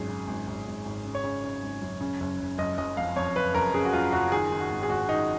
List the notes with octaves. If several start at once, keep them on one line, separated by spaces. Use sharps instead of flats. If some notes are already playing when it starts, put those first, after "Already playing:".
Already playing: G#1 F#2 G#4
C#3
G#1
G#1
G#1
G#1
C#3
C#5
C#3
C#3
G#1
F#2
C#3
F#1
F#1
F#1 D#5
F#1 D#5
F2 F5
F2 C#5
F#1 B4
F#1 A#4
C#3 G#4
F#4
F#1 F4
F#1 F#4
D#3 G#4
D#3
F#4
G#1
G#4
G#1 F#4
D#3 D#4